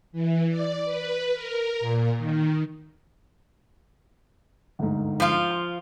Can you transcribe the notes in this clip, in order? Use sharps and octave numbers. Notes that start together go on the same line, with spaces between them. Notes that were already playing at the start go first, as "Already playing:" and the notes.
E3
D5
B4
A#4
A#2
D#3
G1 D2 G#2
F3 F4
C6